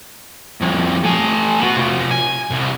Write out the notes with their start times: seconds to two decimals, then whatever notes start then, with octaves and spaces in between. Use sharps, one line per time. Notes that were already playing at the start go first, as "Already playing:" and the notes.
0.61 C2 F2
1.04 A3 G#5
1.60 B3 F#4
1.77 C3 F4
2.11 G#5
2.51 C2